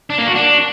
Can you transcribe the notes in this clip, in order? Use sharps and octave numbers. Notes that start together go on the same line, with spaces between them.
D4
A#3
F#4
D4